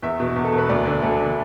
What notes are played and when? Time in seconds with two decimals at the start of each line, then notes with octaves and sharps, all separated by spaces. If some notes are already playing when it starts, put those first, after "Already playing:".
0.02 E2 E5
0.20 B2
0.36 E2
0.45 A4
0.53 B2 B4
0.69 D2 D5
0.85 D3
1.02 D2 A4
1.20 D3